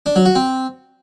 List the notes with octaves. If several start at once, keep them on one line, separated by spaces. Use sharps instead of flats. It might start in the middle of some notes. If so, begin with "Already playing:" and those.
D4
F#3
F#4
C4